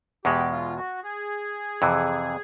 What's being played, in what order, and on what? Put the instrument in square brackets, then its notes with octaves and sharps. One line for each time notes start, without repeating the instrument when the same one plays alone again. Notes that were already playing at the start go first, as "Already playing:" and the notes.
[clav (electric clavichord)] E2 B2 G#3 [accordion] G4
[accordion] F4
F#4
G#4
[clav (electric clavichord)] F2 C3 E3